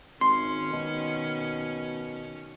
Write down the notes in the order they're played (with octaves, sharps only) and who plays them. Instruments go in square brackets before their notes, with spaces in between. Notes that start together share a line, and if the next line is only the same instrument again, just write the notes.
[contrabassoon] G#1 [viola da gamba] D#3 C#4 [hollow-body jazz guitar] C6
[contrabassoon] B2